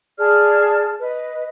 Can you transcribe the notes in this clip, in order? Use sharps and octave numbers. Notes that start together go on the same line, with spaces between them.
G#4 D5 A5 F6
B4 D#5